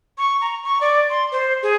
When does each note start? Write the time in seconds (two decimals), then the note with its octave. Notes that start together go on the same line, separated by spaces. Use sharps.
0.18 C#6
0.41 A#5
0.64 C#6
0.81 D5
1.10 C6
1.32 C5
1.63 G#4